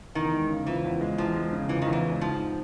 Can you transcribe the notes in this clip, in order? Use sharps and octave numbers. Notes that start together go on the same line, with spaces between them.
E2 D#3
G#3
C#3
E3 F3
E2
G#3
E2 F3
G#3
C#3
E3 F3
E2 D#3
E3
G#3
G#2 F3
C4